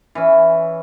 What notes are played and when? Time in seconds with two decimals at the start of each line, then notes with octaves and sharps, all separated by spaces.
0.15 E3 C#4